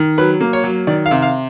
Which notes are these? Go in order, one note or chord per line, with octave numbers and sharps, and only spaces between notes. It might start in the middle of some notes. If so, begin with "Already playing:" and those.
Already playing: D#3
F#3 B4
A#3
C#5
F#3
D#3 D5
F5
C3
F5